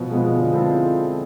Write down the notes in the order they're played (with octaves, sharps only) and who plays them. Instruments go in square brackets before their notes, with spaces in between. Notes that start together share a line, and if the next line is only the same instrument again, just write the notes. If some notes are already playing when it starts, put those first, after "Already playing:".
Already playing: [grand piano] B2 [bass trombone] F3
[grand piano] G#3 B3
D3
G#3 C4 E4 A4